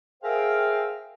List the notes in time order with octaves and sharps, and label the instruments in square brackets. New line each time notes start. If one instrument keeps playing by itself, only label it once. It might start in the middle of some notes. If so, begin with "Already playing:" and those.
[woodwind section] G#4 A#4 C5 E5 F5 G5